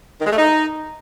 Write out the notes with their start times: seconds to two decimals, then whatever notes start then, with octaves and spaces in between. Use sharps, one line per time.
0.21 D#3
0.26 G#3
0.32 A3
0.37 D#4